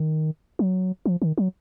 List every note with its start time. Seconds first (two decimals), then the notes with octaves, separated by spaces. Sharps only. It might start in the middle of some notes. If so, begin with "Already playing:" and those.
Already playing: D#3
0.59 F#3
1.06 F3
1.22 D#3
1.38 F#3